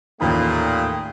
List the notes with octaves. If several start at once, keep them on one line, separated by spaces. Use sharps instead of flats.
A1 D#2 A#2 A3 G#4 G5 B5